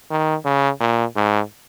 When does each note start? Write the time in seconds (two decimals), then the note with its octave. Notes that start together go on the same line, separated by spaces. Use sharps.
0.11 D#3
0.45 C#3
0.80 A#2
1.16 G#2